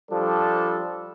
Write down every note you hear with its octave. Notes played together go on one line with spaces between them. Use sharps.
F3 G3 D4 A4